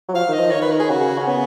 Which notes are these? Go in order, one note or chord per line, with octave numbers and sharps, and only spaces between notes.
F#3
F3 F5
D#3 D#5
F3
D#3 C#5
B4
A#4
G#4
C#3 F#4
C#4
B3